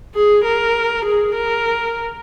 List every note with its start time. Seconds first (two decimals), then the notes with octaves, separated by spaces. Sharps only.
0.15 G#4
0.44 A#4
1.05 G#4
1.35 A#4